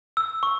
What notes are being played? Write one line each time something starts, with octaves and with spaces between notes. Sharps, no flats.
E6
C#6